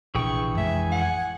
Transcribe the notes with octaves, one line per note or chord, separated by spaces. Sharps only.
A#1 C3 E3 D4 G#4 G5 C#6
A1 F2 G#3 E5 G#5
F#5